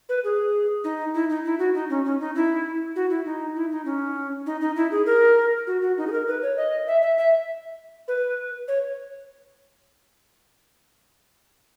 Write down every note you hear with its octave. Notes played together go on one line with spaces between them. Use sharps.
B4
G#4
D#4
E4
D#4
E4
F#4
D#4
C#4
C#4
D#4
E4
F#4
E4
D#4
E4
D#4
C#4
D#4
D#4
E4
G#4
A#4
F#4
F#4
D#4
G#4
A#4
B4
C#5
D#5
E5
E5
E5
B4
C#5